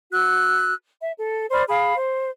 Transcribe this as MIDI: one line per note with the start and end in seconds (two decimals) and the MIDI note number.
0.11 0.73 66
0.11 0.73 88
0.11 0.73 90
1.00 1.12 76
1.18 1.47 69
1.51 1.63 72
1.51 1.63 74
1.51 1.63 83
1.51 1.63 89
1.69 1.94 68
1.69 1.94 77
1.69 1.94 83
1.96 2.30 72